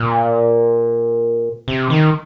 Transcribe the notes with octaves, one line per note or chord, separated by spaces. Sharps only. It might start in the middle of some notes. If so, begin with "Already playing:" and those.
Already playing: A#2
C3
D#3